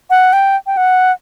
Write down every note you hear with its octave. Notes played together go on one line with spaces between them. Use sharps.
F#5
G5
G5
F#5